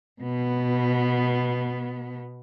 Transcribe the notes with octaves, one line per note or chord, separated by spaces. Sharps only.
B2 B3